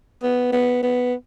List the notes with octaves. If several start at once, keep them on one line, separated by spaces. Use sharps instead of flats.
B3
B3
B3